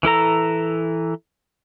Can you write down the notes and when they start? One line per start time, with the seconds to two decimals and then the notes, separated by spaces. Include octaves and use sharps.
0.03 E3 E4 A4 A#5